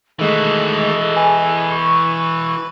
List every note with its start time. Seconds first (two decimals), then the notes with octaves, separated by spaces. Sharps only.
0.19 D#3 E3 G#3 A3 F#4 G#4 A4 D#5
1.16 B4 G#5
1.71 C#6